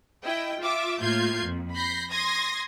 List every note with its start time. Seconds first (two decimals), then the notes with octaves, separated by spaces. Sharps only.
0.24 E4 D#5 G5
0.60 F4 E5 D6
0.99 A2 A#3 F4 G6 G#6 C7
1.43 F2
1.74 B5 G6 A#6 C7
2.10 C6 D#6 G#6 A#6